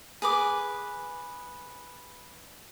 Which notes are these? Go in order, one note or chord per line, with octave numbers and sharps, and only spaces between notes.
G#4 B4 D6